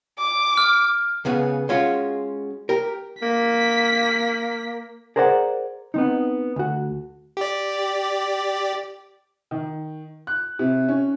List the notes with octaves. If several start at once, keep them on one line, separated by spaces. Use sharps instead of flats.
D6
F6
C#2 C#3 B3 G#4
G#3 C#4 F4 F#4
G4 A#4
A#3 B6
G#4 A#4 C5 D5 F#5
B3 C4 D#4
D2 F#4
G4 D5
D#3
F#6
C3
C#4